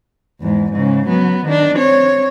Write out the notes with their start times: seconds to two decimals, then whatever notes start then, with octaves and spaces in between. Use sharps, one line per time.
0.41 E2 G#2
0.72 G#2 C#3
1.07 F#3 B3
1.46 D#3 D4
1.76 C4 C#5